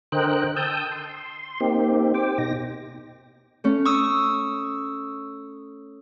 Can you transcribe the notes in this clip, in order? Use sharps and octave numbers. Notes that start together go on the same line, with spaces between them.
D3 A#4 C5 D#5 G5 F#6
G5 A5 D#6 E6 G6
C6
A#3 C4 D#4 G4
G4 C5 G5 D6
B2 D#4 A#6
A3 C#4
C#6 D#6 E6